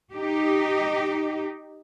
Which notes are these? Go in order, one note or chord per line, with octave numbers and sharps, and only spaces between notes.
D#4 G4